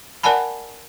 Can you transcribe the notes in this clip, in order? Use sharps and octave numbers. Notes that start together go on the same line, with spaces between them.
A#4 D5 F#5 G#5 A5 B5